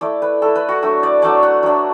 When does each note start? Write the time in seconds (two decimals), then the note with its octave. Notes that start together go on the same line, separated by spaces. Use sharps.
0.01 A3 E4 D5
0.22 B4
0.42 A3 E4 A4
0.55 B4
0.69 F#4
0.82 F#3 A3 D4
1.03 D5
1.22 F#3 A3 D4 D5
1.43 F#5
1.63 F#3 D4